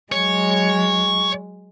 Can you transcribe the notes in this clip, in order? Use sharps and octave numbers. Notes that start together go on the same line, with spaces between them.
F#3 G#3 C#5